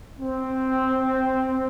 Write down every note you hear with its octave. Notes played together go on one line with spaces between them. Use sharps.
C4